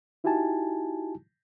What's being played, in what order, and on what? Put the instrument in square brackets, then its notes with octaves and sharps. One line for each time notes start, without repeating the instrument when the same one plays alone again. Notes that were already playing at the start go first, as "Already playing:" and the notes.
[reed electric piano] D#4 E4 F#4 G4 G#5 A5